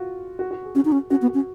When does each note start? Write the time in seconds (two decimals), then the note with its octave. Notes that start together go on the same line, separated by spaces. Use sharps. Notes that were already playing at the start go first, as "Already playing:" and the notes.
Already playing: F4 F#4
0.39 F#4
0.51 F#4
0.63 G#4
0.75 C#4 F#4
0.85 D#4
0.92 C#4
1.10 C#4 F#4
1.22 B3
1.28 F#4
1.34 C#4